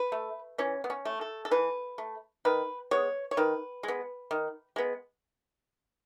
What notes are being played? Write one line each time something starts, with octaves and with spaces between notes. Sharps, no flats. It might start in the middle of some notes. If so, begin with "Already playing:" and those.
Already playing: B4
A3
E3 C#4
B3
C#4
A3
A4
A4
E3 B4
A3
D#3 B4
G#3 B3 C#5
C#5
D#3 B4
G#3
B3
D#3
G#3 B3